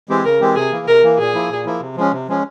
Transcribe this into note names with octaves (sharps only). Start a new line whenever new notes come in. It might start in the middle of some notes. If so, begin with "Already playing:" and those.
E3 G#3 C4 G4
C#3 A#4
E3 G#3 C4 G4
C3 G#4
E3 A#3
C3 A#4
E3 A#3
A#2 G#4
F3 A#3 E4
A#2
F3 A#3 E4
C3
F3 G#3 C#4
C3
F3 G#3 C#4